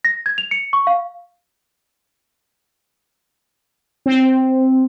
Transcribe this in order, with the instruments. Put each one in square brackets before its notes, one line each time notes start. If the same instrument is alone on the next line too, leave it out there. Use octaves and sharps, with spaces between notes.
[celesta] A#6
G#6
F7
C#7
C#6
F5
[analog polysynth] C4